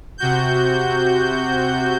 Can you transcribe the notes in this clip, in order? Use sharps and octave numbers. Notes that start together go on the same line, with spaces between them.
C3 F#4 G6